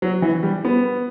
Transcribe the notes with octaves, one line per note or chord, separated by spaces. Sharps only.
F#3
E3
G3
B3